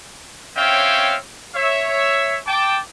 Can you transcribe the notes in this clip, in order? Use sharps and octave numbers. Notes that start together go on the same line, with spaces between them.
C4 C#4 C#5 E5 F5 G5
C#5 E5
G5 A5 D6